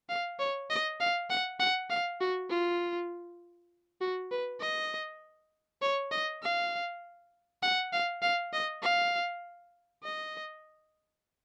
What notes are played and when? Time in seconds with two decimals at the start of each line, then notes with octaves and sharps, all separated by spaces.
0.09 F5
0.39 C#5
0.70 D#5
1.00 F5
1.30 F#5
1.60 F#5
1.90 F5
2.20 F#4
2.50 F4
4.01 F#4
4.31 B4
4.61 D#5
5.82 C#5
6.12 D#5
6.42 F5
7.62 F#5
7.93 F5
8.22 F5
8.53 D#5
8.83 F5
10.04 D#5